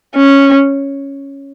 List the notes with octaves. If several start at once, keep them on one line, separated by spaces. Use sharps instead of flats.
C#4